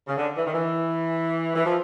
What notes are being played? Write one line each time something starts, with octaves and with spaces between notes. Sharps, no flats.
C#3
D3
E3
D#3
E3
E3
F3